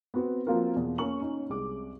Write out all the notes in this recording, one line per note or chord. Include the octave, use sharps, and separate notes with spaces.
B3 C4 F#4 B4
F3 A#3 C4 F4 F#4 A#4
E2 B2
A#3 C#4 C#6 F#7
C#4 D#4
C2 G#3 D6